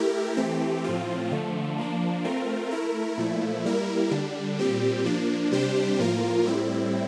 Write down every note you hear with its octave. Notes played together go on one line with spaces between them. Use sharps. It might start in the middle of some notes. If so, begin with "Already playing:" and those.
Already playing: A3 E4 G4 A#4
E3 A3 C4 G4
A2 F3 C4 F4
D3 F3 A3
F3 A#3 D4
A3 C4 F4 A#4
A3 E4 A#4
A#2 F3 A3 E4
G3 A#3 E4 A#4
D3 G3 D4
A#2 G3 C4 G4
F3 A#3 D4
C3 G3 D4 G4 C5
A2 F3 A#3 F4 A#4
A2 G3 C4 E4